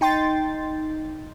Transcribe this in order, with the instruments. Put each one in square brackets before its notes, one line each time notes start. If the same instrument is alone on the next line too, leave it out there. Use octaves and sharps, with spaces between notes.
[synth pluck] D#4 G5 C6 A6